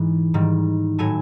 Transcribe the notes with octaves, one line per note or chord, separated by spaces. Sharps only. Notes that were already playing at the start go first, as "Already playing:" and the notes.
Already playing: G#2 E3 G#3
G#2 D#3 G3
A2 F#3 A3 G#5